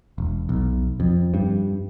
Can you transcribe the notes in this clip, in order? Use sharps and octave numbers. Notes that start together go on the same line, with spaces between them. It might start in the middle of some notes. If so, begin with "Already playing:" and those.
E1
B1
F2
G2